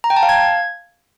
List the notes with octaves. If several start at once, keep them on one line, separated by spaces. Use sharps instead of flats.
A#5
G5
A5
F5
G#6